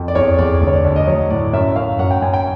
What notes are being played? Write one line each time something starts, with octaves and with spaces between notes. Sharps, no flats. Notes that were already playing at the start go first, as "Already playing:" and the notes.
Already playing: F2
D5
E2 C#5
E2 D5
D2
C#5
D5
D2 D5
D#5
F#3 C#5
A2 D5
F#2 E5
F#2 F5
F#2 F#5
G5
F#2 G#5
G5